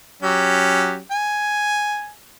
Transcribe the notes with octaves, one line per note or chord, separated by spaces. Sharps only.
F#3 C#4 G4
G#5